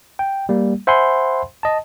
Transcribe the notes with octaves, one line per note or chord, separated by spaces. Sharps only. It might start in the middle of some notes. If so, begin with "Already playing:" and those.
G5
G3 A#3
C5 E5 F#5 G#5 B5 C6
D#5 A5